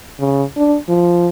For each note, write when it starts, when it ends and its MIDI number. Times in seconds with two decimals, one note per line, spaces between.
0.19 0.44 49
0.56 0.77 62
0.88 1.29 53